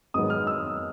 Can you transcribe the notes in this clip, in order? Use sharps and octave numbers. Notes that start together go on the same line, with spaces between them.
G#2 D#3 F#3 B3 D#6
F6
E6